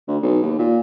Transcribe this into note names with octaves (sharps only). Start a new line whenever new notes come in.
D2
B1
D#2
A#2